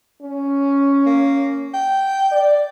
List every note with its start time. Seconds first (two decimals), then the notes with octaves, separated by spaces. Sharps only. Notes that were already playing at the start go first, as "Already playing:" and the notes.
0.22 C#4
1.06 A#3
1.74 G5
2.32 D5